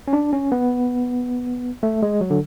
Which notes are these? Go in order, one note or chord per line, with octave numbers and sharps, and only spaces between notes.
C#4
D4
C#4
B3
A3
G#3
F#3
D3